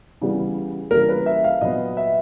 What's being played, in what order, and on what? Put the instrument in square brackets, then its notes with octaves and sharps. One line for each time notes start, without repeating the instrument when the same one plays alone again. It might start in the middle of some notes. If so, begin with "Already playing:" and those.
[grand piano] C#3 E3 G3 B3
C#3 E3 G3 A#3 A#4
B4
E5
F5
A#2 F#3 B3 D#5
E5